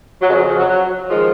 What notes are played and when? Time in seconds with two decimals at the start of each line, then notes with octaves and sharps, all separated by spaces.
0.21 F#3
0.28 C#3 F3 G#3
0.32 F2
0.38 F#3
0.49 F3
0.59 F#3
0.69 F#3
1.09 D#3 F3 G#3